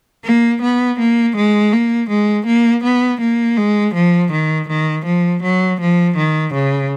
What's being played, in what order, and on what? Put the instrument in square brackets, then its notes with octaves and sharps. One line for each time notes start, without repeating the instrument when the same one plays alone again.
[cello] A#3
B3
A#3
G#3
A#3
G#3
A#3
B3
A#3
G#3
F3
D#3
D#3
F3
F#3
F3
D#3
C#3